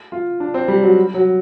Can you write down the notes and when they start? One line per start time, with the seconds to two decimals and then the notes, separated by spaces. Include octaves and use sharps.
0.12 F4
0.40 D4
0.54 C4
0.68 G3
0.82 F#3
1.14 F#3